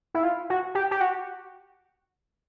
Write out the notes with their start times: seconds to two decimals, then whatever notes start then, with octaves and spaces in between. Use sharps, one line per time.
0.15 E4
0.23 F4
0.50 F#4
0.75 G4
0.91 G4
1.01 F#4